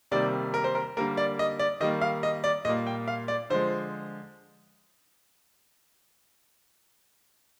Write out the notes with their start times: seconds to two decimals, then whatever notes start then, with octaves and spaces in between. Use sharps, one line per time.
0.11 C3 D#3 G3 A#3 D5
0.54 A#4
0.64 C5
0.75 A#4
0.97 D3 G3 A#3 A#4
1.17 D5
1.39 D#5
1.59 D5
1.80 D#3 G3 A#3 D#5
2.01 F5
2.23 D#5
2.44 D5
2.65 A#2 G3 A#3 D#5
2.86 G5
3.08 F5
3.28 D5
3.50 D3 F3 G#3 C5